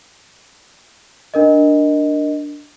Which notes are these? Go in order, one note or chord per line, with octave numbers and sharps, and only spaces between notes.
D4 A#4 D#5